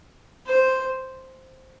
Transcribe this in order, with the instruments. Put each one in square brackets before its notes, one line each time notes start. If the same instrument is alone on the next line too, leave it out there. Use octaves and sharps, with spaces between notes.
[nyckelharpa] C5